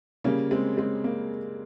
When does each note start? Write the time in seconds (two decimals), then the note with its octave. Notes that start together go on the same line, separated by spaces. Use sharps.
0.24 C#3 G3 A#3 C#4
0.51 G#3 C4
0.77 G#3 C4
1.04 A#3